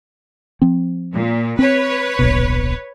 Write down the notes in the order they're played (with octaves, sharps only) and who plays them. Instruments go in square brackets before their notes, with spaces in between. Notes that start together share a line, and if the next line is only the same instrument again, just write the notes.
[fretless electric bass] F3 C4
[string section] A#2
[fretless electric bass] C4 [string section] B4 C#5
[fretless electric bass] D1 A#1 B2